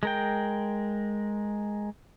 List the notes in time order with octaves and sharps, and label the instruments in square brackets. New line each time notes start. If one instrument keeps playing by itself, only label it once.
[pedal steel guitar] G#3 A#4 G5